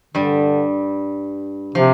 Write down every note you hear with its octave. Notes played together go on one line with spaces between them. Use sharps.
G2 D3 G3
C3 F3